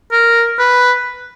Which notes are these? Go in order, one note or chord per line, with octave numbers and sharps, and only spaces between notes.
A#4
B4